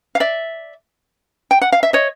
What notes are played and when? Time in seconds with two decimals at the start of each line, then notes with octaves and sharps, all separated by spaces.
0.15 F5
0.20 D5 E5
1.51 G5
1.61 F#5
1.72 F5
1.83 E5
1.93 C#5 D#5